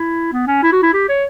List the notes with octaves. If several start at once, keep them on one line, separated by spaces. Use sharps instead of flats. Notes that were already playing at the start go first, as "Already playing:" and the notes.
Already playing: E4
B3
C#4
E4
F#4
E4
G4
C#5